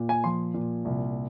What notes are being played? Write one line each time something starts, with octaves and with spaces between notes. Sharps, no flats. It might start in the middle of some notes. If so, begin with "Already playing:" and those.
Already playing: A#2
G#5
F3 C6
A#2
C2